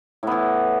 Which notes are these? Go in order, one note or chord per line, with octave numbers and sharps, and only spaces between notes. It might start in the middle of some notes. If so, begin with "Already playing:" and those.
A2 E3 B3